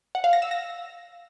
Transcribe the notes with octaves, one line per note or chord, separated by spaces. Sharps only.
F#5
F5
A#6
E6
A#6